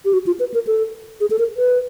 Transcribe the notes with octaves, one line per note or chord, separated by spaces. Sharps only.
G4
F#4
F4
B4
A#4
A4
G#4
A4
A#4
B4